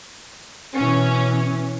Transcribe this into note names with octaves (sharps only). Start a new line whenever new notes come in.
B2 E3 C#4